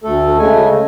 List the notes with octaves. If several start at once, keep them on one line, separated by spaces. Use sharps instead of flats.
D2 A3 A4
C#3 G#3 A3 G#5